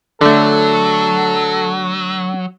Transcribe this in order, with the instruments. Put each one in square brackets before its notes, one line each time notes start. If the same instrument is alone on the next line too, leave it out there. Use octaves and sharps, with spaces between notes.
[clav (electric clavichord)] D3 A3 [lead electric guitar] F#3 [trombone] A4